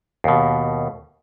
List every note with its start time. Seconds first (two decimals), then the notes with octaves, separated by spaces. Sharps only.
0.24 D#2 B2